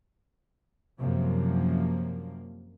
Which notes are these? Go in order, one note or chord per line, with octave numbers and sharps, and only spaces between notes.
F#2 C3 F3 A#3